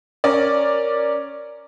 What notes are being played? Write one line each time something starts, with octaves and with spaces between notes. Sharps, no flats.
C#4 A#4 D5